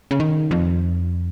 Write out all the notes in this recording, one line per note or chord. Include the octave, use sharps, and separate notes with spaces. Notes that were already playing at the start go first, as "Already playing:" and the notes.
C#3
D#3
F2